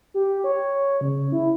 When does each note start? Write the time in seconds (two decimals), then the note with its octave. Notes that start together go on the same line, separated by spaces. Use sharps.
0.14 G4
0.44 C#5
1.01 C#3
1.32 E4